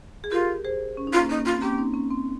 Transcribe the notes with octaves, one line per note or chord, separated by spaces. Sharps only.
G#4
F4 G4 A#4
G#4 C5
C#4
D#4
F4
A#3 C#4
A#3 C#4 D#4
F4
C4
A#3 C#4 G4
C4 D#4
A#3 C#4
C4